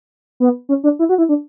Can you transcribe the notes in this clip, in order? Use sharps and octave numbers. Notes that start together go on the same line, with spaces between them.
B3
C#4
D4
E4
F#4
E4
D4